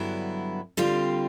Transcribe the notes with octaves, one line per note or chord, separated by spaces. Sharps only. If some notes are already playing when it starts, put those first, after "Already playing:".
Already playing: G2 D3 F#3 B3 E4
D3 G3 C4 F4